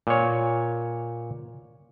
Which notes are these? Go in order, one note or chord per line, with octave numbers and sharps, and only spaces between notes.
A#2 C#5